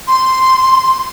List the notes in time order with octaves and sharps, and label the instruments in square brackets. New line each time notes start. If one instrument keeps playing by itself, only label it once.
[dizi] C6